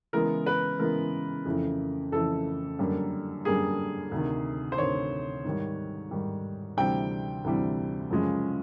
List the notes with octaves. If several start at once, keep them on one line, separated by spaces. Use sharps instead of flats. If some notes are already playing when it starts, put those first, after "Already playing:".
C#3 E3 G#3 B3 A#4
B4
C#3 E3 G#3 B3 A#4
F2 C#3 E3 A3
F2 C#3 E3 A3 A4
F#2 D3 G3 A#3
F#2 D3 G3 A#3 G#4
D2 C3 D#3
C5
D2 C3 D#3 C#5
G#2 D#3 G3
G#2 D#3 G3
D2 C3 E3 G3 C4 G5
D2 C3 E3 G3 C4
F#2 C#3 F3 G#3 C#4